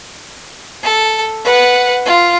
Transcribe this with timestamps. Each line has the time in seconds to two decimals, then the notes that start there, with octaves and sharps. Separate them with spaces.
0.83 A4
1.44 B4 F#5
2.05 F4